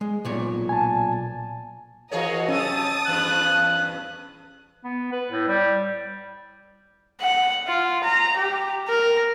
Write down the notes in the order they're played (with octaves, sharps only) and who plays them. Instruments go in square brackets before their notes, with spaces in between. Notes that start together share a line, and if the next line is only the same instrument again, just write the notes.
[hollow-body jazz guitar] G#3
B1 A#2 C#5
[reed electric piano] G#5 A5
[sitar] E3 G#4 C#5 [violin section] F#4 A#4 D#5
[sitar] C3 F#3 [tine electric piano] C#4 [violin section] A5 D#6 A6
[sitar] E2 G2 C4 [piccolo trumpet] F#6
[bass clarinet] B3
B4
A2
G3
[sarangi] F#5
F4
A#5
G4
A#4